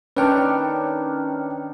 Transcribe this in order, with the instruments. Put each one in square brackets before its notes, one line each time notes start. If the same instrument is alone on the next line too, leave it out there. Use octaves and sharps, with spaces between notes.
[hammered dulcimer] D#3 D4 [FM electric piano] C#4 C#5 F6 [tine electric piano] B4 G5